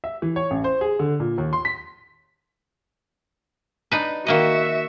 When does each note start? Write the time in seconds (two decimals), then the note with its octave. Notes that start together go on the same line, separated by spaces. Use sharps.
0.04 E5
0.22 E3
0.36 C#5
0.51 A1
0.64 C5
0.81 G#4
0.99 D3
1.20 A#2
1.38 D#2
1.53 C6
1.65 B6
3.92 D4 D#4 B4
4.27 D#3 A#3 F#4 D#5 E5